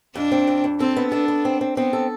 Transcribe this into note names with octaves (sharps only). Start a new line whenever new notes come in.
F2 D4
C4
F2
F2
C4 A4
B3
D4 A4
B3
C4
C4
B3 C4
A4